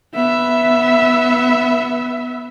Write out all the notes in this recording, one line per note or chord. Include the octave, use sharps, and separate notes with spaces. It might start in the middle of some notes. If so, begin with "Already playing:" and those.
B3 E5